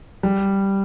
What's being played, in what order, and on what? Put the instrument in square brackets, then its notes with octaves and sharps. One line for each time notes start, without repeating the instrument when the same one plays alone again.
[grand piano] G3